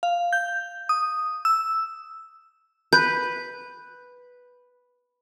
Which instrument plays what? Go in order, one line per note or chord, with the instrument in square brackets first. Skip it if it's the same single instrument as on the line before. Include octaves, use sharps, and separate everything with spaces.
[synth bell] F5
G6
D#6
E6
[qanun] B4 [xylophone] G6